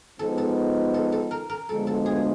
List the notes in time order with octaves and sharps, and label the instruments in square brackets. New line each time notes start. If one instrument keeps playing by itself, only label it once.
[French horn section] F3 G#3 B3 D#4 [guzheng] A4
[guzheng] A4
A4
A4
A#4
A#4
[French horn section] D2 D3 F3 G#3 B3 [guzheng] A4
[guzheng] A4
G#4